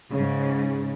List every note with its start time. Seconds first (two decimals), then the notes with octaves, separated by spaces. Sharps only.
0.11 G#2 C#3